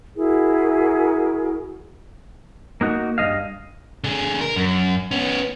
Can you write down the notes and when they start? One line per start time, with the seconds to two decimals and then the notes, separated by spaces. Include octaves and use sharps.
0.16 E4 F#4 G#4 A#4
2.81 A#3 D#4 F#4
3.18 G2 F3 D#5 F5
4.04 D3 G#4
4.41 A#4
4.56 F#2
5.11 B3 C#4